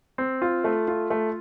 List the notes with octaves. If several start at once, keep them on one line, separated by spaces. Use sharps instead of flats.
C4
F4
A3
F4
A3